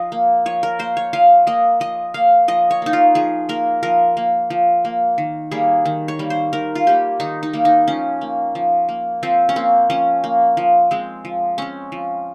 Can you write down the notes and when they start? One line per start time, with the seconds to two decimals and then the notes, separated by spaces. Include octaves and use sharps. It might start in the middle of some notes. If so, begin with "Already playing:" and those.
Already playing: F3 D#5 F5
0.12 A#3
0.46 F3 C#5
0.63 A#4
0.79 A#3 C5
0.97 C#5
1.13 F3 F5
1.47 A#3 D#5
1.80 F3 D#5
2.14 A#3 F5
2.48 F3 D#5
2.71 C#5
2.82 A#3 D#4
2.93 F4
3.15 F3 G#4
3.49 A#3 A#4
3.83 F3 A#4
4.17 A#3
4.50 F3
4.85 A#3
5.18 D#3
5.51 G3 A#3 G#4
5.85 D#3
6.08 C#5
6.19 G3 A#3
6.30 C5
6.53 D#3 A#4
6.75 F4
6.86 G3 A#3 G4
7.20 D#3 D#4
7.43 D#4
7.53 G3 A#3
7.65 D#4
7.88 F3 C#4
8.21 A#3
8.55 F3
8.89 A#3
9.23 F3 C4
9.49 C#4
9.56 A#3 C4
9.90 F3 C#4
10.24 A#3
10.57 F3
10.91 G#3 C4
11.25 F3
11.58 G#3 C4 C#4
11.92 F3